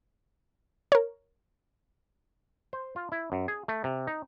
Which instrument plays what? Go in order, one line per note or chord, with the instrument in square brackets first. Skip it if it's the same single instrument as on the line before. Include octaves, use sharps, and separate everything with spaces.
[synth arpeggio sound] A#4 C#5
[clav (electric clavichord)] C5
F4
E4
F#2
G#4
A3
C3
D#4